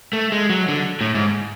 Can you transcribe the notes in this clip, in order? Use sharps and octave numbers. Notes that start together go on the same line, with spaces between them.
A3
G#3
F#3
D3
A2
G#2